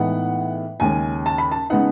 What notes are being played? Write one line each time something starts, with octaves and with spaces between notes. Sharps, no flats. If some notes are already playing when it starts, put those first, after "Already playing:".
Already playing: A2 E3 G#3 B3 D#4 F#5
D#2 C#3 G#3 C#4 G#5
A5
B5
A5
C#3 G#3 B3 D#4 F#5